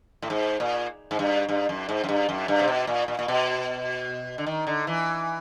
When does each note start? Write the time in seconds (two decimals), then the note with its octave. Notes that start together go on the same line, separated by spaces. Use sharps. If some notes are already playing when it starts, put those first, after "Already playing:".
0.22 A2
0.30 G#2
0.60 A#2
1.11 G#2
1.19 G2
1.49 G2
1.69 F#2
1.89 G#2
2.04 F#2
2.09 G2
2.29 F#2
2.48 G2
2.59 C3
2.68 B2
2.87 A#2
3.08 A#2
3.19 A#2
3.28 B2
4.38 D3
4.47 D#3
4.67 D3
4.87 E3